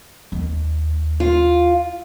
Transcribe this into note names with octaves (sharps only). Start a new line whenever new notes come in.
D#2
F4